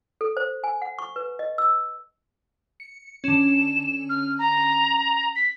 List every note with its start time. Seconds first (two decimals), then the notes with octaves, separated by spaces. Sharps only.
0.21 A4
0.37 C5
0.64 G#5
0.82 F#5
0.99 C#6
1.16 B4
1.39 D#5
1.58 E6
2.80 C#7
3.24 D3 C#4 E7
4.09 F6
4.39 A#5
5.35 B6